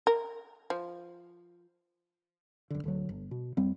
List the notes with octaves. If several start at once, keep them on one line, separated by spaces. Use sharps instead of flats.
A#4
F3
F#1 D3
D1 D3 F#3
G1
B2
F2 G3 C4